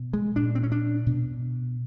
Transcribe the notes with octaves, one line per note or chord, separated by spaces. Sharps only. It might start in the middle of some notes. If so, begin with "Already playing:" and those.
Already playing: B2
G#3
A#2 D4
C4
C#4
D4
B2